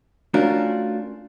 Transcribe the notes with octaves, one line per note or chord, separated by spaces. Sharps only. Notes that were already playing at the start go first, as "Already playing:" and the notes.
A3 C#4 D4 F4 F#4 A#4